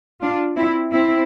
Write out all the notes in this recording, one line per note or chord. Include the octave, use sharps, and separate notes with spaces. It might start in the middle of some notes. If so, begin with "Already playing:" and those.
D4 F4
C4 E4
C4 E4